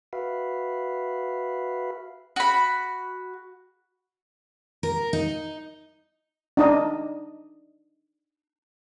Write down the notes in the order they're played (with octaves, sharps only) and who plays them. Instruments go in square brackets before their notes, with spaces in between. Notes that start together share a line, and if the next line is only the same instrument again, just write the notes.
[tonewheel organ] F#4 B4 E5 F5
[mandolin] F#4 B5
[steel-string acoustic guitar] A#4
D#4
[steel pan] D4 D#4 D#5